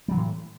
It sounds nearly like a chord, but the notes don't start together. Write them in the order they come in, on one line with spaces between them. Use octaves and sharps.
G3 F#3 E3 A2